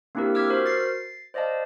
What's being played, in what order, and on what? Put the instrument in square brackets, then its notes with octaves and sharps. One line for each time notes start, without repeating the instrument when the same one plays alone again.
[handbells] A#3 C4 D4 E4 G4 A#4
D6 E6 F6 G#6 B6
F#4 A#4 C5 F6
A6 C7
C5 D5 D#5 F5 A5